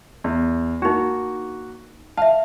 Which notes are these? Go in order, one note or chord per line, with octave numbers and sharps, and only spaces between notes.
E2
A#3 D4 D#4 F#4
E5 F5 A5